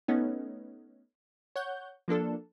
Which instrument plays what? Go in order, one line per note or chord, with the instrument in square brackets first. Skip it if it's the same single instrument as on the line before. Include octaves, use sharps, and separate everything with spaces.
[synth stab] A3 B3 C#4 D#4
C#5 F#5 G6
F3 A#3 D4 A4